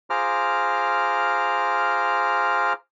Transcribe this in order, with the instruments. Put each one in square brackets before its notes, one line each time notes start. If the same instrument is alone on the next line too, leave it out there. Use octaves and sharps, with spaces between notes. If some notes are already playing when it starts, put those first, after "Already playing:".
[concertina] F4 G#4 C5 A#5 D6 F6